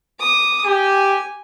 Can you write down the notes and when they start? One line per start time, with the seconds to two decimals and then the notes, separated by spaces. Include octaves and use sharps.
0.20 D6 D#6
0.66 G4 G#5